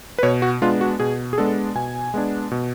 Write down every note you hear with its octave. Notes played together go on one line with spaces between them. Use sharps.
B4
B2 C#5
F#4
G#3 B3 D4 F4
F#4
B2 G#4
G#4
G#3 B3 D4 A4
B2 G#5
G#3 B3 D4
B2